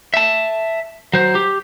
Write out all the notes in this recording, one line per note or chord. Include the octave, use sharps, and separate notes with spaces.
E5 A5
F#3 C5
G4